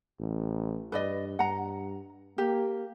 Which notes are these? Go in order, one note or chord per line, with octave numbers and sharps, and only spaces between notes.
A1
G2 B4 D5 D#5
G2 F#5 A#5
A#3 G4